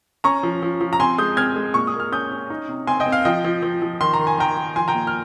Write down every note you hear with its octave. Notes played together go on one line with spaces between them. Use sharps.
C#4 A#5 C#6
F3
F3
F3
A#5
C4 G#5 C6
G#3 D#6 G6
C4 F6 G#6
G#3
A#2 C#6
D#6
A#3
F6
C#4 D#6 G6
C#4
D#4
C3
C4 G#5 C6
D#5 G5
C4
F5
F3 D#5 G5
F3
F3
F3
D#3 C6
A#5
D#3
G#5
D#3 G5 A#5
D#3
F3 G#5 C6
G5 A#5
A#2
F6